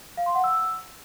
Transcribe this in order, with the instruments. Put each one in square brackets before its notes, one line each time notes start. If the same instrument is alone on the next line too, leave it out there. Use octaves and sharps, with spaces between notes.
[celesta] F5
C6
F#5
E6